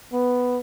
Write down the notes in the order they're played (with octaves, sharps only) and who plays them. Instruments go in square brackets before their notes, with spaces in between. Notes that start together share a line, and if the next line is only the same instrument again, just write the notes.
[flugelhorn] B3